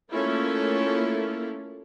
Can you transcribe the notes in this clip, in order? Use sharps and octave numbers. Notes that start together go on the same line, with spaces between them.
A3 A#3 C#4 E4 F4 A4